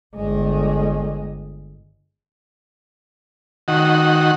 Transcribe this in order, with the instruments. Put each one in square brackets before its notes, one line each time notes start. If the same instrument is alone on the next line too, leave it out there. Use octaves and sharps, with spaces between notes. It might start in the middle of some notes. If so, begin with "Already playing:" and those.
[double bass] G1 G#3
[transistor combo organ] D#3 F#4